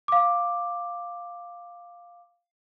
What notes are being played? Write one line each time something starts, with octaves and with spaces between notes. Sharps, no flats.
F5 D6